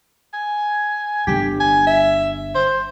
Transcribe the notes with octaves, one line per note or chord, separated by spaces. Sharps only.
G#5
G1 D3 G4
G#5
E5
C5